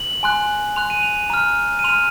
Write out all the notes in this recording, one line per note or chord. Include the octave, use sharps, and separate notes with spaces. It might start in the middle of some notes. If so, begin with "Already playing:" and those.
Already playing: F#7
G#5 C6 F#6
C6 F#6 F7
D#7
F7
A#5 F6
D#7
C6 F6 F7